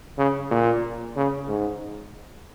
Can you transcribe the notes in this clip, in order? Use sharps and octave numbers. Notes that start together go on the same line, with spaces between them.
C#3
A#2
C#3
G#2